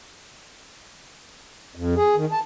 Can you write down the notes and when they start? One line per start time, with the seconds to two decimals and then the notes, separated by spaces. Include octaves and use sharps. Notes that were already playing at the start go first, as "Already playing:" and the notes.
1.75 F2
1.97 G#4
2.16 D#3
2.32 A5